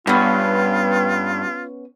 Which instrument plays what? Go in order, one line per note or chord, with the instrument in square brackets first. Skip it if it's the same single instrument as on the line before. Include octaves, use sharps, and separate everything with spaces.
[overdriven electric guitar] G2 [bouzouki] B3 C#4 [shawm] F4